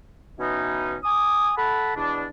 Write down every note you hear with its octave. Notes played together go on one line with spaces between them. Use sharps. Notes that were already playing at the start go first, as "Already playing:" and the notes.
B2 E3 C#4 D#4
G#5 D6 D#6
A4 F#5 A5 B5
E2 B2 D4